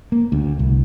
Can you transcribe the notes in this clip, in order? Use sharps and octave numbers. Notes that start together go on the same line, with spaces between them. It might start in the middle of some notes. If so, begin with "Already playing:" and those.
A#3
D2
C2